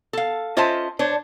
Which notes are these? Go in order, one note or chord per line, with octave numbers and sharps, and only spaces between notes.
A4 F5
C#4 F4 C5 D#5 E5 A5
D4 C5 C#5